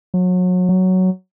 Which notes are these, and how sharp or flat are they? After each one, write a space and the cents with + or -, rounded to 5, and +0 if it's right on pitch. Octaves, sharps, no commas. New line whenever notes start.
F#3 -30
F#3 +5